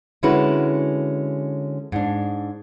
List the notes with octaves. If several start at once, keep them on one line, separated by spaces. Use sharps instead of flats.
D3 G#3 C#4 E4 F#4 B4
G#2 D4